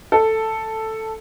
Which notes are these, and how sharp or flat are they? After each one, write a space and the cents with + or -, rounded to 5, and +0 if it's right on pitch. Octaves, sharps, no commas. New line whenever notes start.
A4 +5